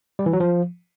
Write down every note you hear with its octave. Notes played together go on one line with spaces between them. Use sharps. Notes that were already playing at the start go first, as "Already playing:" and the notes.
G3
E3
F#3
F3